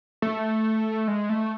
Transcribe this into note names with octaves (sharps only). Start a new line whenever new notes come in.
A3
G#3
A3